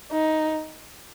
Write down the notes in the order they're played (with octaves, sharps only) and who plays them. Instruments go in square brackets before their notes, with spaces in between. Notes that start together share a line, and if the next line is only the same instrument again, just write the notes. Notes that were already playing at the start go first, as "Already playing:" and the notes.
[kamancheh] D#4